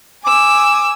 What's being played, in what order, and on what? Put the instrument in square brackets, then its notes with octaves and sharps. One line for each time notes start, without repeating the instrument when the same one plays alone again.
[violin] G#5 E6 [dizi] D6